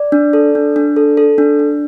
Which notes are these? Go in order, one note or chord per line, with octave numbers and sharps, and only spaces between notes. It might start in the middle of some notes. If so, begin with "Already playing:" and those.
Already playing: D5
D4
A4
D4
D4
A4
A4
D4
D4